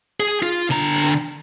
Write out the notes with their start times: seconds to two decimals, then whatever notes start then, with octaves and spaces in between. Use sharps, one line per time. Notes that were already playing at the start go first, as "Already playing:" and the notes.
0.20 G#4
0.43 F4
0.70 D3 A#5